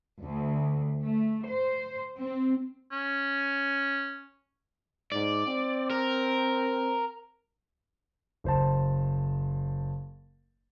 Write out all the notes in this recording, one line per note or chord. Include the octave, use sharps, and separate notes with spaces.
D2
A3
C5
C4
C#4
G#2 D5
C4
A#4
F#1 C5 A5